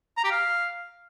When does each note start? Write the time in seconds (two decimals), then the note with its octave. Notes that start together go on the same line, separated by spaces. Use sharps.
0.17 A#5
0.24 G4
0.31 F5